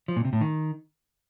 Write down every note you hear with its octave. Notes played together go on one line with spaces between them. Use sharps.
F3
A#2
C3
A2
D#3